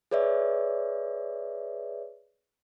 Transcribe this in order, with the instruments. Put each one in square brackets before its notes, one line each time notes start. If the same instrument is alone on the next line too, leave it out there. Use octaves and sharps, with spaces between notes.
[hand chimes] G#4 B4 C#5 D5 E5